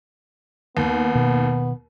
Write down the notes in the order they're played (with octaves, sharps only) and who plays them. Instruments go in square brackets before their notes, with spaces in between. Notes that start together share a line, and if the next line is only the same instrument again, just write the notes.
[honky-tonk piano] D#2 [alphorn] B3
[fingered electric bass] B2 D#3